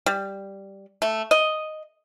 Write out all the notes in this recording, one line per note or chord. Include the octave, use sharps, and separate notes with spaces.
G3
A3
D#5